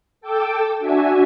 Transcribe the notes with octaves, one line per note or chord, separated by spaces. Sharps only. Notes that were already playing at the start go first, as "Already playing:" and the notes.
A4 G5 D6 E6
D4 F#4 E5 G#5